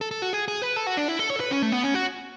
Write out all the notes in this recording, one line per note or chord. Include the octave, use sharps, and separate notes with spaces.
A4
A4
F#4
G#4
G#4
B4
A4
F#4
D4
E4
A4
C#5
A4
B4
C#4
A3
B3
C#4
F#4